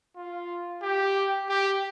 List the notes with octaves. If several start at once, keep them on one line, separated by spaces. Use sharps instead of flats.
F4
G4
G4